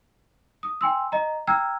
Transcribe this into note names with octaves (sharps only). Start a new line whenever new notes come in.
D#6
G5 G#5 C6 E6
D#5 A#5
G5 A#5 E6 F6 G#6